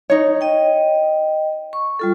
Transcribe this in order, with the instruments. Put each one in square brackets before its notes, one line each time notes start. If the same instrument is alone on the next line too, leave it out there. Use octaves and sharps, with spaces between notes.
[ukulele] D#4 C#5
[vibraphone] D#5 G5
C#6
G3 F4 A4